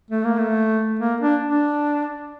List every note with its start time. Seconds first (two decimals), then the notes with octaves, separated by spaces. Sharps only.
0.10 A3
0.24 A#3
0.38 A3
0.99 A#3
1.21 D4
1.43 D4